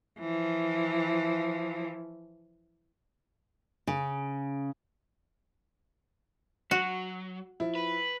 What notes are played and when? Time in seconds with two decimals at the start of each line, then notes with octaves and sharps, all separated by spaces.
0.20 E3 F3
3.87 C#3
6.71 F#3 F#4
7.60 F3 E4
7.75 B4